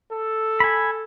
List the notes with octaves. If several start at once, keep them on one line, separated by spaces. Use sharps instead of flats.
A4
G#5 B5